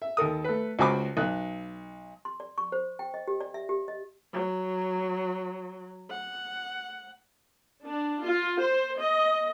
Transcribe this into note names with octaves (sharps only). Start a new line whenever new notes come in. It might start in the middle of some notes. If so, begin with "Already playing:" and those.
E5
D#2 A4 A#4 D#6
A3 B4
C#2 F#4 C5 G#5 B5 D6
B1 F#6
C6
D5
C#6
C5
G5
D#5
G4
D5
E5
G4
D#5
F#3
F#5
D4
F4
C5
D#5